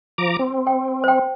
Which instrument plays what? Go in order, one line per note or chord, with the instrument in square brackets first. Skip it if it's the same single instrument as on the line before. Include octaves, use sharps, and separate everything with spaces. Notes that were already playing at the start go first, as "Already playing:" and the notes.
[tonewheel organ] F3 A#5 D6
C4
[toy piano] G5
C5 G5